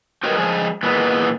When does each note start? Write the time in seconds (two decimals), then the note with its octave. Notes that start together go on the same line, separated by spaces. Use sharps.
0.23 F#4 G4 A#4 B4 C#5 D#5
0.37 F3 G#3 G#4
0.83 A#2 E3 G#3 B3